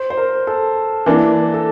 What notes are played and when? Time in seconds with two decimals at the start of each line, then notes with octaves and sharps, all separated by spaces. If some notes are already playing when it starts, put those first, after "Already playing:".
Already playing: C5
0.10 C5
0.17 A#4
0.47 A4
1.06 E3 A#3 D4
1.54 A4